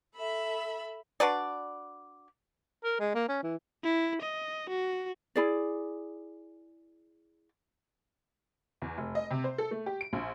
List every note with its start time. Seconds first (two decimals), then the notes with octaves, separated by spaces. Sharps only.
0.15 A4 E5 B5
1.20 D4 F#4 B4 D5
2.84 A#4
3.00 G#3
3.15 A#3
3.28 C#4
3.43 E3
3.84 E4
4.22 D#5
4.70 F#4
5.36 E4 G#4 D5
8.82 E2
8.98 F1
9.15 D#5
9.31 C3
9.44 C5
9.58 A4
9.71 A3
9.86 G4
10.01 D7
10.13 A#1